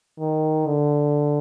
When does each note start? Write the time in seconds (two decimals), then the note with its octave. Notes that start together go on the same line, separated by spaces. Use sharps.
0.19 D#3
0.66 D3